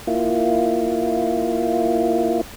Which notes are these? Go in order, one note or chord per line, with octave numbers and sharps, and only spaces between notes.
A#3 E4 F4